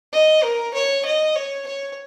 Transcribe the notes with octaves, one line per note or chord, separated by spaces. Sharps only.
D#5
A#4
C#5
D#5
C#5
C#5